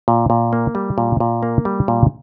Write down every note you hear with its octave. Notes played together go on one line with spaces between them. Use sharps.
A#2
A#2
A#3
G3
A#2
A#2
A#3
G3
A#2